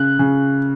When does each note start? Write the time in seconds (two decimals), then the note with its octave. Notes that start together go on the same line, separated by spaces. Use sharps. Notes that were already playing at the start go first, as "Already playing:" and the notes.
Already playing: C#3 F#6
0.19 C#3